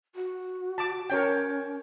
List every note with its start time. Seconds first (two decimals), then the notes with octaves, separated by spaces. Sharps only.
0.15 F#4
0.78 A5 D6
1.10 C#4 A#4 C#5 G5